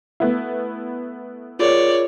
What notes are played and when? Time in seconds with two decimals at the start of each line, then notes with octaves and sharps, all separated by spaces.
0.20 A3 B3 E4
1.59 F4 G#4 A#4 C#5 D5